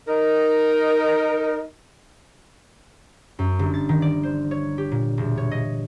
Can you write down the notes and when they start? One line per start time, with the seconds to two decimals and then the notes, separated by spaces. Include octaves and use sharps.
0.07 D#4 A#4
3.39 F#2
3.59 G1
3.74 A6
3.89 D#3
4.02 D5
4.23 C5
4.51 C#5
4.78 G4
4.91 A#2
5.18 E1
5.38 C#5
5.51 D#5